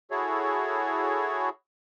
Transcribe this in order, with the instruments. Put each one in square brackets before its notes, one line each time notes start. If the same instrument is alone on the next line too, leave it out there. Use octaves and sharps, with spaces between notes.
[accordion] E4 F#4 G#4 A4 C#5